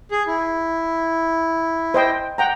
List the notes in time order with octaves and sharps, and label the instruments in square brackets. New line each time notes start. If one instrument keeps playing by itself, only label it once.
[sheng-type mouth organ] G#4
E4
[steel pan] C5 D#5 G5
F#5 G5 A#5